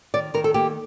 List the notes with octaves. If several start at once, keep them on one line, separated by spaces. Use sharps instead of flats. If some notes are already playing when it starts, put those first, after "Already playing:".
D#3 D5
D#3 A#4
A4
A#3 G4